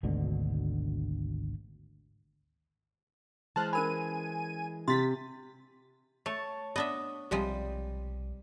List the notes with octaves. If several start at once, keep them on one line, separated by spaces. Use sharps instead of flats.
G#1 D2 B2 D3
E3 G#3 C5 A5 F6 F#6
C#4 A#4 G#5 B5 D#7
C3 C6 A6 B6
A3 C#5 A5
B3 D4 D#5 E5
B1 C3 F3 G3 G#3